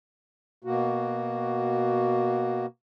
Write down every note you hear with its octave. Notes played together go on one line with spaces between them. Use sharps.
B2 A#3 F#4